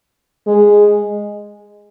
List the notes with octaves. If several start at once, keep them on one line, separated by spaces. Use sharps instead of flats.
G#3